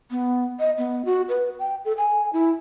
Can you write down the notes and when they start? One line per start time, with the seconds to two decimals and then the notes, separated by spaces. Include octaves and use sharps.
0.11 B3
0.60 D#5
0.78 B3
1.05 F#4
1.29 B4
1.59 G5
1.85 A4
1.98 G#5
2.33 E4